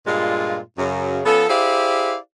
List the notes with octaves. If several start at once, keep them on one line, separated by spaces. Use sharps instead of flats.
G2 A#2 G#3 F4
F#2 C#3
F3 B3 C#4 A4
E4 G4 G#4 C5 D5 F5